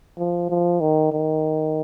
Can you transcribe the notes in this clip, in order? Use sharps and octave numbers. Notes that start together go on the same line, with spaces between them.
F3
F3
D#3
D#3